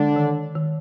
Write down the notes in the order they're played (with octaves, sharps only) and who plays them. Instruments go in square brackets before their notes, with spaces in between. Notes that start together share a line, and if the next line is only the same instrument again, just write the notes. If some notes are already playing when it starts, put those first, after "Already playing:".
Already playing: [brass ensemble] D3 D4 [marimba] G#3
[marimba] D#3
D#3